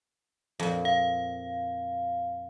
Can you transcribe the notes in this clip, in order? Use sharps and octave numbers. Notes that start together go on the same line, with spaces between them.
F2 A#2
F5